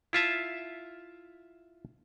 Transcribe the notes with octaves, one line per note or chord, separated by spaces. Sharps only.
E4 F4 E5 A5